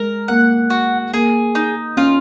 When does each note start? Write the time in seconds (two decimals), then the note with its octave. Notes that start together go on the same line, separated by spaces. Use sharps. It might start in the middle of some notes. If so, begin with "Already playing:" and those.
Already playing: G#3 A#4
0.28 A#3 F#5
0.70 F#4
1.13 A#3 G#4
1.55 D#4
1.97 C#4 F4